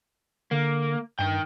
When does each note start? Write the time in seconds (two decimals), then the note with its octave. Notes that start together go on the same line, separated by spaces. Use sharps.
0.51 D3 A#3
1.19 G2 D#3 G5